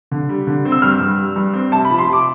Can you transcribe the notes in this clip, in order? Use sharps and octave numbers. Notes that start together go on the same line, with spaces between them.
D3
G3
D3
C4
E6
G2 F6
G2
G3
G2
C4
C3 A5
B5
F3
C6
C3
D6